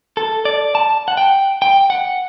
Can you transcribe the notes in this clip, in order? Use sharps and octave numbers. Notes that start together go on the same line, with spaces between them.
A4
D5
A5
F#5
G5
G5
F#5